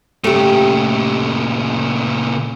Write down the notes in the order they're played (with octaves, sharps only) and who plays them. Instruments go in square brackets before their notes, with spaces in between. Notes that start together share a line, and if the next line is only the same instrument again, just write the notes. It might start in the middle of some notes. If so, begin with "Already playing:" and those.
[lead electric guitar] A#2 C#3 [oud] A3 G4